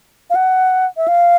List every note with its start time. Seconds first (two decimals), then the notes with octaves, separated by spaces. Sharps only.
0.30 F5
0.35 F#5
0.97 E5
1.08 F5